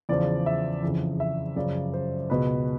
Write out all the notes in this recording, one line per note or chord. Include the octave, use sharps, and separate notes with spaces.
E2 C#3 F3 D5
E5
F2 C#3 E3
E5
F#2 C#3 F3 D5
C5
C#2 B2 B4